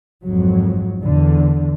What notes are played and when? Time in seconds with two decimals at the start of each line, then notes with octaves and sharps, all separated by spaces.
0.23 G#1 F2 F#3
1.04 E2 D3